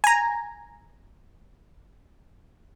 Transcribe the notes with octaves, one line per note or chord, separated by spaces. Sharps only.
G#5 A#5